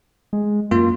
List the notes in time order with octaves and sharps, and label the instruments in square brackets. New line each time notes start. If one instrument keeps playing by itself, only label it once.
[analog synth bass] G#3
[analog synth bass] F#2 [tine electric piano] A#3 F4